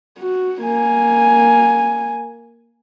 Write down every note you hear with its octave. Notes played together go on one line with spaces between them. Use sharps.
F#4
A#3 G#5